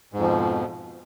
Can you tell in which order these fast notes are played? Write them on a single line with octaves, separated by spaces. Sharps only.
G#2 F2 F3 B2